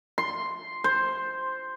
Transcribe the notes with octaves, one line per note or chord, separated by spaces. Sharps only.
C6
C5